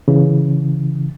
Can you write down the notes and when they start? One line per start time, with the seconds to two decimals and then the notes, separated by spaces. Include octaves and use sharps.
0.08 C#3 E3